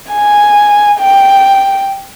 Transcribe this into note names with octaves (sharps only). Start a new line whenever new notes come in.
G#5
G5